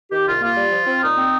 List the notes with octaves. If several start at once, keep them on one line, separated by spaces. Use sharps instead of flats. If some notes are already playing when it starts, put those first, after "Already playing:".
D#3 G4
C2 F4
A#3 F4
G3
F3
C4
A#2 D#4
C4